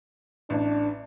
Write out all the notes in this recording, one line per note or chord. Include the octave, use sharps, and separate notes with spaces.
A1 D4